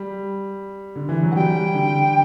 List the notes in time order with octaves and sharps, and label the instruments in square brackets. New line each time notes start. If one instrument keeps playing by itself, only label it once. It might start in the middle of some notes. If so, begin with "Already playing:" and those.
Already playing: [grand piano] G3
D3
E3
F#3
[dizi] F#5
[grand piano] G3 [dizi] G5
[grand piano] D3